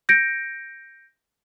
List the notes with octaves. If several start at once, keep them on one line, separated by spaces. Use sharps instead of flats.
G6 A#6 C#7 D7